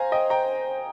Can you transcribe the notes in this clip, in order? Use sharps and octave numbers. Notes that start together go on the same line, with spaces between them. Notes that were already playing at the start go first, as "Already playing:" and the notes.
Already playing: C5 F5 G#5 A#5
D#5 G5
G5 A#5